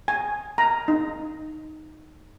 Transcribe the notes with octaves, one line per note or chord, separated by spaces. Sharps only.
G#5
A#5
D#4